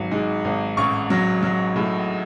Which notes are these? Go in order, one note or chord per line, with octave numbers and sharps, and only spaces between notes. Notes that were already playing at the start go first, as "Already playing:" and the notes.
Already playing: G#1 F#3
G#2
G#1
A1 C#6
F#3
F#3
A2